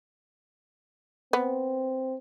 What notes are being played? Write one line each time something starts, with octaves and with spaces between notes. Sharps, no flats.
B3 C4